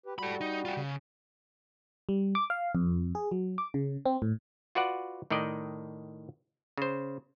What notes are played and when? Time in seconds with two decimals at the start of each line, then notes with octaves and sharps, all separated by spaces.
0.06 G4 B4
0.19 G3 F#4 A4 B5
0.41 D#4
0.65 F4 G4
0.77 C#3
2.09 G3
2.35 D6
2.50 F5
2.75 F2
3.15 G#4
3.31 F#3
3.58 D6
3.74 C#3
4.06 C4
4.22 A2
4.75 F4 F#4 B4 D5 F#5
5.30 A2 D#3 D#4 D5 D#5
6.78 C#3 C5